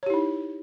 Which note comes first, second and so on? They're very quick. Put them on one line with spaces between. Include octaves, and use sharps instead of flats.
C#5 G4 E4 D#4